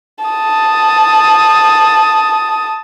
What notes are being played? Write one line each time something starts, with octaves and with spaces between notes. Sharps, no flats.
A5 D#6